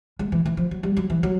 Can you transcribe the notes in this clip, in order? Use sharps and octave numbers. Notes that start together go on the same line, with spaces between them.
G#3
E3
E3
F3
F#3
G3
F#3
E3
F#3